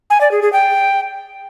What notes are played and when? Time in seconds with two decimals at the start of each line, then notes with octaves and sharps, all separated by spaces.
0.10 G#5
0.21 D5
0.31 G#4
0.42 G#4
0.53 G5